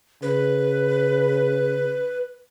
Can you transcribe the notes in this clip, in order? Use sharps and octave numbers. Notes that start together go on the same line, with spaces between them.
C#3 B4